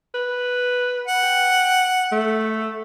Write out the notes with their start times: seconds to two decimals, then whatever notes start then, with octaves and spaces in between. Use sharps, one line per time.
0.15 B4
1.08 F#5
1.23 G5
2.12 A3